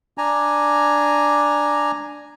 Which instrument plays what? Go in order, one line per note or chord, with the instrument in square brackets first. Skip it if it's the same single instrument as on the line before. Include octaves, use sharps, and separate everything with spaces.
[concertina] D4 G#5 A#5